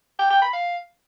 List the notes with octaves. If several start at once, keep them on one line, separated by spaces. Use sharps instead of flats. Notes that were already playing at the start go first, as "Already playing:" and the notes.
G5
G5
B5
F5